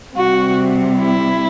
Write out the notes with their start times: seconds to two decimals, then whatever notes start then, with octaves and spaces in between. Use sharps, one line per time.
0.15 C3 G3 C4 F#4
1.00 E4